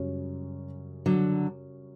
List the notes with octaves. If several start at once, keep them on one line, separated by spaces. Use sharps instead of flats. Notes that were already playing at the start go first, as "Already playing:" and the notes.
Already playing: F#2 C#3 G3 C#4
D3 F#3